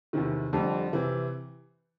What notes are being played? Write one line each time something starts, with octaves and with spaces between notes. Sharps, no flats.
E2 C3 D#3
F2 D3 G3
C3 E3